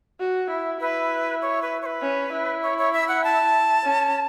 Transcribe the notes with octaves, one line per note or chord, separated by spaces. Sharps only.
F#4
E4
E4 B4
C#5
B4
C#5
B4
C#4
E4
C#5
C#5
E5
F#5
A5
C#4